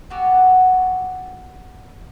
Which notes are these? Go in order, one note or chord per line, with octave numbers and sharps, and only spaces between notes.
B3 F#4 G4 A4